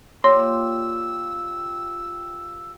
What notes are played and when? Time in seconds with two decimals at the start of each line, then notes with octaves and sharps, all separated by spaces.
0.24 A#2 F4 G4 C#5 C6 E6